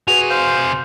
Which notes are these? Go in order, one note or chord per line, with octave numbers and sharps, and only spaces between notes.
C3 F#4 G#4 B4 G#5 F7
C5 F5 G6